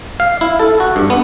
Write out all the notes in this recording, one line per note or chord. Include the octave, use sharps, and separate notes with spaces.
F5
E4
A4
F#4
G2
B3